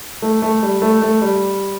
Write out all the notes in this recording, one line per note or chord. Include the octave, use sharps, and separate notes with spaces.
A3
A3
G3
A3
A3
G3